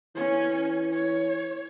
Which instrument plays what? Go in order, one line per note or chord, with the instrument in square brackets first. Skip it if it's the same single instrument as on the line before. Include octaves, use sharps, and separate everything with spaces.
[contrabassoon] E3 [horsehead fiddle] C#4 C#5
[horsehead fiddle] C#5